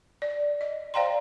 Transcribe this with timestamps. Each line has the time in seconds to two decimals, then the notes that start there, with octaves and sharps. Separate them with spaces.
0.22 D5
0.61 D#5
0.94 C5 D5 F5 G5 A#5 C6